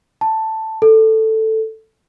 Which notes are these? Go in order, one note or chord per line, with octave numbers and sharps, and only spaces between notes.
A5
A4